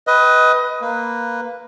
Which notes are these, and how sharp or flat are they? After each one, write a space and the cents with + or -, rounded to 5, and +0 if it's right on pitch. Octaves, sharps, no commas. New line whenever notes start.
B4 +5 D#5 +20 G5 -15
A#3 +0 B4 +0